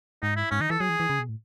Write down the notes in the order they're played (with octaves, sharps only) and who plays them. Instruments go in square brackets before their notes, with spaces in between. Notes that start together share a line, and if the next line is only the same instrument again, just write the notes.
[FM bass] G#2 [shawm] D#4
[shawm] E4
[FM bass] G#2 [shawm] C#4
[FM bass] D#3 [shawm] D#4
[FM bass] E3 [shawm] A4
[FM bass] F#3 [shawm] G#4
[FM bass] E3
E3
C#3
B2
A2